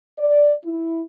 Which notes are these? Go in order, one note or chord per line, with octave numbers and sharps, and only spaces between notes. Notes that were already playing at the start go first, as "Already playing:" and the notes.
D5
E4